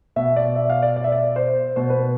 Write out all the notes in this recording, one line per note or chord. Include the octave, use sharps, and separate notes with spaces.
B2 E5
D5
E5
F5
D5
D5
E5
D5
C5
B2 C5
B4